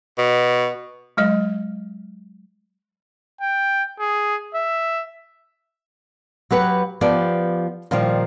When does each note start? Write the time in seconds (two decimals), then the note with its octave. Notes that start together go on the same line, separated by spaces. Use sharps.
0.18 B2
1.17 F#3 G#3 D#5
3.41 G5
4.00 G#4
4.55 E5
6.51 F#3 G4 B4 F#5
7.01 F3 B3 G4 D5
7.91 A#2 D#3 F3 G3